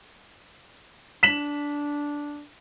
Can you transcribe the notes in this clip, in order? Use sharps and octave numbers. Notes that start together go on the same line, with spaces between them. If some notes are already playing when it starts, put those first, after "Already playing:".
D4 B6 E7 F#7